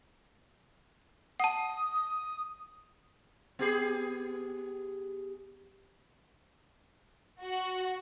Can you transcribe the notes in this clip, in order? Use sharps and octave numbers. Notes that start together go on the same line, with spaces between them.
F#5 A5 D#6
B3 G4 G#4
F#4